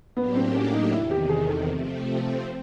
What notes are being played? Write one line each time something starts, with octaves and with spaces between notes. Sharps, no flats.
A2 F#3 A#3 B3 D4 G4
C4
C#4
D#4
E2 C3 D#3 E4
G4
G#4
A4
C3 F3 A3 C4